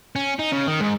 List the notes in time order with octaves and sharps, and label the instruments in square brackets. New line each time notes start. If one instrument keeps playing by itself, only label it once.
[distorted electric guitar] C#4
D#4
C#3
D#3
G#2